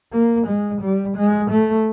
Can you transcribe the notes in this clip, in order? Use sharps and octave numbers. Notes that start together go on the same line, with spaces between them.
A#3
G#3
G3
G#3
A3